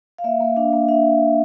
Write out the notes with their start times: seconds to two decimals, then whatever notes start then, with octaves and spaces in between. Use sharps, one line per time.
0.18 F5
0.24 A#3 E5
0.40 A#3
0.56 D4 F5
0.73 A#3
0.88 D4 E5